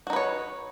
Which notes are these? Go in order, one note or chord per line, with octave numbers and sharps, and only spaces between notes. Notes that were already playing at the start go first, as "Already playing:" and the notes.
D#4 F#4 B4 C#5